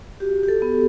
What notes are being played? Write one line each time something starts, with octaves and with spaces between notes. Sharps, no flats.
F#4 G4
G4
A4
B3